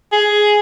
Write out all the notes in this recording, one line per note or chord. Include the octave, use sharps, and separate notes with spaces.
G#4